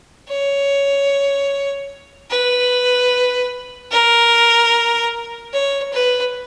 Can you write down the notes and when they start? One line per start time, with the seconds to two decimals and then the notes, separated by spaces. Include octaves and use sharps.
0.29 C#5
2.30 B4
3.92 A#4
5.53 C#5
5.93 B4